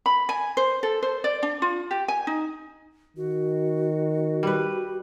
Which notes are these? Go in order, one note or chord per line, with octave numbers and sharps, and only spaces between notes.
B5
G#5
C5
A4
C5
D5
D4
F4
G4
G#5
D#4
D#3 F#4
G3 B4